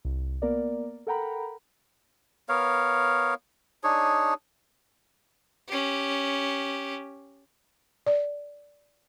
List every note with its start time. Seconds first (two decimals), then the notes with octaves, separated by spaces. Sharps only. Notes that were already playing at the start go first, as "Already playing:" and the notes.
0.05 C2
0.42 A#3 B3 A#4 D5
1.07 A4 A#4 F#5 G5 A#5 B5
2.49 B3 A#4 C#5 F5
3.84 D4 D#4 G#4 C#5
5.68 C#4 G4
8.06 D5